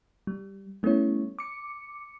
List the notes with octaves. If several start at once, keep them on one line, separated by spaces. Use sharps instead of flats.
G3
G3 A3 B3 C#4 E4 C#5
D6 C#7